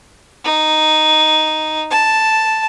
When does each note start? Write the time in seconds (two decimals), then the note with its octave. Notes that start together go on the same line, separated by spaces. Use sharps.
0.45 D#4
1.91 A5